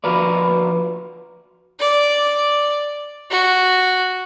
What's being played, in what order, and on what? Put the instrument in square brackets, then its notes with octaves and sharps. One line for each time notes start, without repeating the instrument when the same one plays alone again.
[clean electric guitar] F3 F#4 A#4 B4 D5
[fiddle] D5
F#4